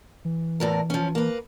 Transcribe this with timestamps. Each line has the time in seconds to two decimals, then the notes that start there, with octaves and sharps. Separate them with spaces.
0.25 E3
0.60 E2 A2 A#4
0.90 F3 C#4
1.15 A#3 B4